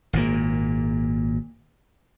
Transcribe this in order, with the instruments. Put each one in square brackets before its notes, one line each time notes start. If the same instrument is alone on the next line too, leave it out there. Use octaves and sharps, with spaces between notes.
[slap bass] G#1 A#2 A#3